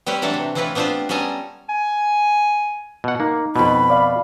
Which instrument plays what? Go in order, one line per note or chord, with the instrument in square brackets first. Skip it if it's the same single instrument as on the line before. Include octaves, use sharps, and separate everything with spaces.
[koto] G3 C4 G4 B4 C#5
E3 F#3 A3 D4 A4
C3
E3 C4 E4 F4 B4 C#5
B3 C4 D4 F4 G4 C5
G3 B3 C#4 A4 G#5 A#5
[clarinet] G#5
[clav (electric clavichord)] B2 F#5
[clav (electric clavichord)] A#3 [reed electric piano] D#4
[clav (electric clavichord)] F2 B2 [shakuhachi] B5
[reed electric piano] D5 F5